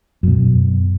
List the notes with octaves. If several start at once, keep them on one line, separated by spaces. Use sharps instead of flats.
F#2 B2